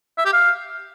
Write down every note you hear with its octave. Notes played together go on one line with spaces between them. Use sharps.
E5
G4
F5